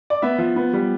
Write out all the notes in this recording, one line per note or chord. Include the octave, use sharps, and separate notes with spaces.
D5
B3 E5
F3
B3
G3